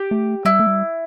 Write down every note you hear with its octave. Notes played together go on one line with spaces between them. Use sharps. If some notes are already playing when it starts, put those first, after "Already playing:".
Already playing: G4
A3
G3 E4
A3
G3